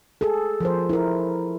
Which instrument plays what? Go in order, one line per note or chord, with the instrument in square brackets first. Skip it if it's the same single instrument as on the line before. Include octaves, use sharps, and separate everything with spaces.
[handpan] G#4 A4
F3 A#4 C5
E4 A#4